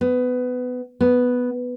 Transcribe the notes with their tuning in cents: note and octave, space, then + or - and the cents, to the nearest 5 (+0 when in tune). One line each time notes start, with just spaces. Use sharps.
B3 +20
B3 +0